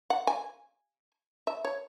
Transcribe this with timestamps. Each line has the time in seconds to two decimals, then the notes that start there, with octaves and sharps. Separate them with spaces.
0.10 F#5
0.27 G#5
1.47 E5
1.65 C#5